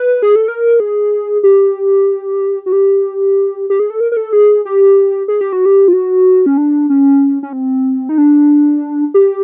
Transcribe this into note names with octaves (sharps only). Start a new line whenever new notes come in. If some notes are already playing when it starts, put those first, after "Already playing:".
Already playing: B4
G#4
A4
A#4
G#4
G4
F#4
G4
G4
G#4
A4
A#4
A#4
A4
G#4
G4
G#4
G4
F#4
G4
F4
F#4
C#4
D4
C#4
C#4
C4
D#4
D4
G4